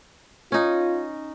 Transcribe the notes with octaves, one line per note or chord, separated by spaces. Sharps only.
C#4 D#4 F4